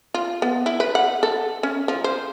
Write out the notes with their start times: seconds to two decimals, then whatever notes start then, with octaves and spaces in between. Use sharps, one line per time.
0.14 F4
0.42 B3
0.66 E4
0.80 B4
0.95 F#5
1.23 A4
1.63 C#4
1.88 F3
2.04 C5